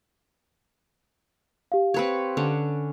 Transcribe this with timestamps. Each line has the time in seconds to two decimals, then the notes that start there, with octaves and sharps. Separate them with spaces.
1.72 G4 F5
1.94 C4 B4 C#5
2.37 D3 C#4